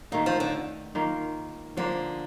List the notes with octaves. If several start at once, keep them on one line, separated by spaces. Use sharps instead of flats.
D#3 A3 A#3 D#4
F3
D3
D#3 A#3 F4
D3 F3 A#3 D4 F4